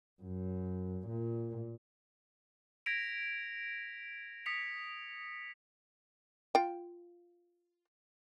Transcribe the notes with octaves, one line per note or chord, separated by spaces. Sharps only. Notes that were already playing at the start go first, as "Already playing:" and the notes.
F#2
A#2
G#6 A#6 B6 D7 F7
D#6 B6 C#7 F7
F4 G5